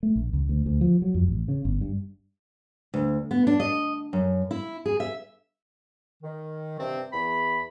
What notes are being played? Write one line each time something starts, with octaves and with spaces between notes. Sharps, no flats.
A3
A#1
C#2
D2
D2
F3
F#3
F2
A1
C#3
G1
G2
D2
B3
D4
D#5
F#2
E4
G#4
E5
D#3
G2 C3 C4
E2 B5